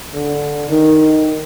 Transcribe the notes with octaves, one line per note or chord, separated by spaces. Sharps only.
D3
D#3